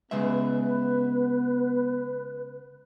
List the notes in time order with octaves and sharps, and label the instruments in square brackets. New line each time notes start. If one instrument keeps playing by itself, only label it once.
[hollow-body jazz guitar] C#3 G#3 E5 [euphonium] B3 [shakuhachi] B4